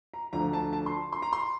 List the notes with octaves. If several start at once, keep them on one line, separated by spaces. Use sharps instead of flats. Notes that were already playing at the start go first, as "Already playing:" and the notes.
A#5
D2 D3 F3 A#5
A5
A5
C6
C6
A#5
C6